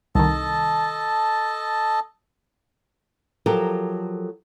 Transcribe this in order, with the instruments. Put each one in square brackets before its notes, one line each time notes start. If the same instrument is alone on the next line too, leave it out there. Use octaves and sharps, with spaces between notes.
[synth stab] C2 D#3 [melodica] A4 D#5 A5
[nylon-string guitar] F3 F#3 G4 A4 A#4